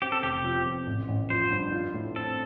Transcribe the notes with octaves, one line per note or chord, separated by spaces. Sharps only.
C4 G4
A4
F1 G4
G4
F3
F2
A1
A1
F3 C5
G2
F4
A2
C4 A4